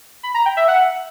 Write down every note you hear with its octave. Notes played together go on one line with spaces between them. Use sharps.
B5
A#5
G5
E5
F#5